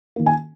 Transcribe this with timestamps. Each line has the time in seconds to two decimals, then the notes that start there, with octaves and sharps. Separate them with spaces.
0.16 D#3 A#3
0.26 G#5